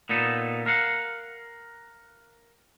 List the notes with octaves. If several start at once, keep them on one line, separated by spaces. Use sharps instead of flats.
A#2 B3 D#4 A4
A#4 F5 F#5